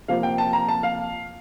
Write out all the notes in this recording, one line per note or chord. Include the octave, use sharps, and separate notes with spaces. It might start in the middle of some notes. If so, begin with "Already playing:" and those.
C3 F3 A#3 F5
G5
A5
A#5
A5
F5